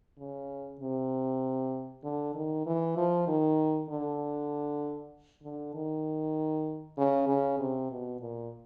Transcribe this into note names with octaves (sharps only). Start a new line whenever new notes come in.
C#3
C3
D3
D#3
E3
F3
D#3
D3
D3
D#3
C#3
C#3
C3
B2
A#2